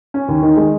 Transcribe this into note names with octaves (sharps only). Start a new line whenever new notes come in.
C#4
D#2
D#3
G#3